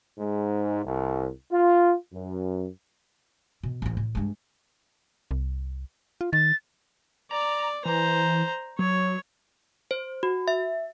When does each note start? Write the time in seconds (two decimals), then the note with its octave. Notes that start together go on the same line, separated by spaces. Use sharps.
0.19 G#2
0.85 C2
1.52 F4
2.13 F#2
3.63 B2
3.82 A1 E4
3.97 A2
4.15 G2 G#3
5.31 C2
6.21 F4
6.33 D#3 A6
7.31 D5 A#5
7.85 E3 C5 A#5
8.79 F#3 C#5
9.91 C5
10.23 F#4
10.48 E5